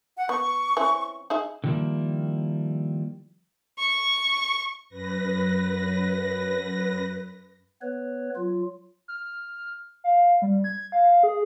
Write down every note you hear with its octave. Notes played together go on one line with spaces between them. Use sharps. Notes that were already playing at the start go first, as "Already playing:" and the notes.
F#5
B3 C#6
E3 C4 C#4
D#4 G#4 E5
D3 D#3 F3 G3 A#3 E4
C#6
F#2 B4 A#6
B3 B4 C#5
F#3 F4
F6
F5
G3
G#6
F5
G#4